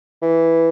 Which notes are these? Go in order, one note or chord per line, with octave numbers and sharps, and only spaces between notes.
E3